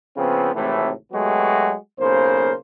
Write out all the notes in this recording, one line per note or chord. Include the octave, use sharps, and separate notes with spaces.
C#3 F3 B3 C4
G#1 A2 C3 E3 A3
F#3 G#3 A3 B3 F#4 G4
B1 C#3 A#3 C5